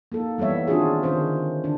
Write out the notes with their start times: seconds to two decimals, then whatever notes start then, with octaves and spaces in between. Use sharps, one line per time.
0.12 A#3 D#4 A4
0.38 E3 G3 B3 C#5 E5
0.68 D#3 C4 D4 F4 F#4 G#4
1.03 D3 D#3 C4 C#4 G#4 C5
1.64 D3 D#3 D4